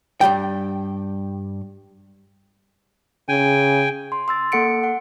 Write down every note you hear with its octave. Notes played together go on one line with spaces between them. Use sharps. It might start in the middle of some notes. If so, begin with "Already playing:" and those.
G2 D#3 G3 G5
C#3 G5 G#5
C6
C6 E6 A6
A#3 A4 F#5 C#7 D7
F#5